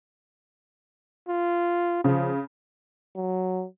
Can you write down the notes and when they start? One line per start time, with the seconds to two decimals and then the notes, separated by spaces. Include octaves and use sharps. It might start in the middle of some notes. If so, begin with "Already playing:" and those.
1.28 F4
2.04 C#3 F3
3.16 F#3